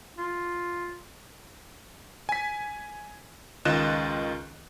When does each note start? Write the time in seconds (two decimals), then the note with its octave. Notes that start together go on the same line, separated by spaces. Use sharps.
0.18 F4
2.29 G#5 B6
3.65 C#2 D#3 F4 D#5 F#6 E7